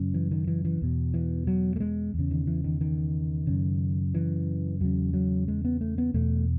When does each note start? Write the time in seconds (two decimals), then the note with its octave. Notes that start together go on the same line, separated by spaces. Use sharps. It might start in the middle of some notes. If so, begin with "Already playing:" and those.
Already playing: F#2 C#3
0.14 E3
0.31 D#3
0.47 E3
0.65 E3
0.81 E2 B2
1.14 E3
1.47 F#3
1.76 A3
1.80 G#3
2.14 E2
2.19 C#3
2.31 D#3
2.47 E3
2.64 D#3
2.81 D#3
3.47 F#2 C#3
4.14 E3
4.81 E2 C#3 F#3
5.14 F#3
5.48 G#3
5.65 B3
5.81 A3
5.98 B3
6.14 E2 B2 A3